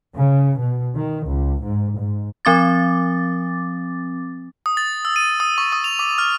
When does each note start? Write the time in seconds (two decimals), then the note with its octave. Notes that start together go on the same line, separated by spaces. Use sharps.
0.15 C#3
0.57 B2
0.95 D#3
1.26 C#2
1.62 G#2
1.97 G#2
2.45 F3 C4 D6 A6
4.66 D#6
4.77 A6
5.05 E6
5.16 D#7
5.40 D#6
5.58 C#6
5.72 D#6
5.84 F7
5.99 D6
6.18 F6